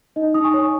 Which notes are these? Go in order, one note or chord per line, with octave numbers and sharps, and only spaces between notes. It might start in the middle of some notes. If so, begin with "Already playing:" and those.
D#4 D#5
D#4 D#6
G#5 C#6
C#5